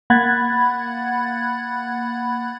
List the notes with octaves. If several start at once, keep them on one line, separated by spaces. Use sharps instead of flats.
A#3 F#5 B5 F#6 G#6 A6